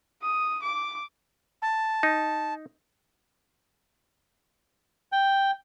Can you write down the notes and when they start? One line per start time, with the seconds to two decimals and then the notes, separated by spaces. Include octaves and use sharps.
0.22 D#6
0.62 D6
1.62 A5
2.03 D#4
5.12 G5